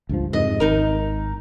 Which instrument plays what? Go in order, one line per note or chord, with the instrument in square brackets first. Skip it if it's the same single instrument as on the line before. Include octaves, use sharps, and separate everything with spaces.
[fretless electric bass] C#2 G2 F3
[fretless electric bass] F2 G#2 C3 [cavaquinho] D#5
[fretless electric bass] G#1 [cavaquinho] D#4 A#4